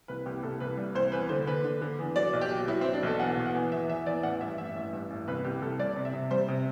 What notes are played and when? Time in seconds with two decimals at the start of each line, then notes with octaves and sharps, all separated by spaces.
0.08 C2 B4
0.26 C2 G4
0.43 C2 A4
0.60 C2 B4
0.77 G3
0.95 C2 C5
1.12 E2 B4
1.29 D3 C5
1.47 D3 B4
1.64 D3
1.82 D3
1.98 E2
2.16 F#3 D5
2.33 B1
2.41 G4
2.51 F#3
2.68 F#3 E4
2.81 C4
2.85 F#3
2.94 D4
3.03 B1 A4
3.20 E2 F#5
3.37 B2
3.46 F#5
3.55 E2
3.72 E2 E5
3.89 E2 E5
4.06 E2 D5
4.23 A1 F#5
4.41 G2 E5
4.58 A1 E5
4.76 A1
4.93 G2
5.10 A1
5.28 C2 B4
5.44 C2 G4
5.62 C2 A4
5.79 G3 D5
5.96 C3
6.05 E5
6.13 C3
6.31 G3 C5
6.48 C3